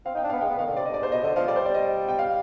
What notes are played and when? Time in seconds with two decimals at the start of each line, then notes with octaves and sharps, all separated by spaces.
0.05 C4 F5
0.15 D#4 G5
0.24 D4
0.30 B3 F5
0.41 G#3 G5
0.50 B3
0.59 D#3 F5
0.67 D3
0.77 C3 D5
0.85 G2 D#5
0.94 D5
1.00 G#2 C5
1.12 B2 D#5
1.23 D3 D#5
1.36 F3 F5
1.47 G3 D5
1.56 C5
1.66 D5
1.74 D#5
2.09 G5
2.19 F5